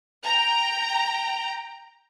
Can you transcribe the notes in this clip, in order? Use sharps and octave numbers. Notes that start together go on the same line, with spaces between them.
G5 A#5